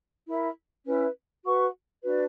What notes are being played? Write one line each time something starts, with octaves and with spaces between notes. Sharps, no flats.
E4 A#4 E5
C#4 E4 B4
F#4 B4 F#5 C#6
D4 F#4 B4